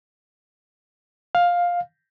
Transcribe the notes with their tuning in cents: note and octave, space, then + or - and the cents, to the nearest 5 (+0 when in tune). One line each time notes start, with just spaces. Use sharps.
F5 +10